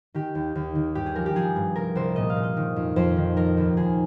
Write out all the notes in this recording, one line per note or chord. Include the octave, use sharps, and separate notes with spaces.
D#3 G4
D#2
D#2
D#3
G2 G4
G#4
F3 A#4
G4
F3 G#4
G2
C2 A#4
C2 C5
A#2 D#5
F5
A#2
D#5
D#3
F2
F2 C5
D#3
F3 A#4
D#2
D#2 G#4